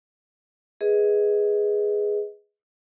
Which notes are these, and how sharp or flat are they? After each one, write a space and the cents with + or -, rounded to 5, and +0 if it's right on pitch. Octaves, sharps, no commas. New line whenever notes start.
G#4 +0 B4 +0 D#5 +25